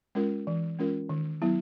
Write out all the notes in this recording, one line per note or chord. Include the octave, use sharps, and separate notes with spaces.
G#3 C#4 F4 A#4
E3
G#3 C#4 F4 A#4
D#3
F#3 B3 E4